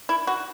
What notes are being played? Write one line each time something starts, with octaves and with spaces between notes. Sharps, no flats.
E4
F#4